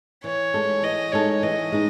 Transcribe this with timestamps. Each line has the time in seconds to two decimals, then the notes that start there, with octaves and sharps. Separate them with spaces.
0.24 E3 C#5
0.54 G#3 D#4 A4
0.83 E3 D#5
1.12 G#3 D#4 A4 C#5
1.43 E3 D#5
1.72 G#3 D#4